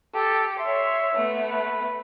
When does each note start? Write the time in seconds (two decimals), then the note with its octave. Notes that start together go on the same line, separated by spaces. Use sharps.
0.14 G4 A4
0.60 C#5 E5 C6
1.14 A3 B3
1.50 B4